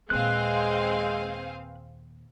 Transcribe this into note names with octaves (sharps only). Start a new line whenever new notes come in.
D#2 A#2 G#3 C4 G#4 B4 F5 F#6